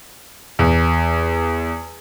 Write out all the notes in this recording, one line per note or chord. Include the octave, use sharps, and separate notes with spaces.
E2